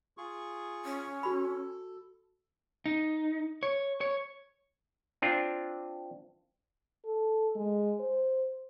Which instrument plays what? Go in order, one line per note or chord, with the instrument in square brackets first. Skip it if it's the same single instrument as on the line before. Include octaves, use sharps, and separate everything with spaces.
[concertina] F4 G#4 C#6
[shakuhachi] C#4
[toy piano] F#4 B5 [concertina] A4
[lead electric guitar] D#4
C#5
C#5
[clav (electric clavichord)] C4 D4 F4
[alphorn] A4
G#3
C5